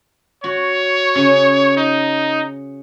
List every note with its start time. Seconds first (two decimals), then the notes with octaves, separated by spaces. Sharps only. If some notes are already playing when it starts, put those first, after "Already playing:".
0.44 F#4 C#5
1.15 C#3
1.77 D#4